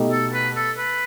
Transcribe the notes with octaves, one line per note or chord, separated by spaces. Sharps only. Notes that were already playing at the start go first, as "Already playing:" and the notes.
Already playing: B2 A3 D#4 G4
A4
B4
A4
B4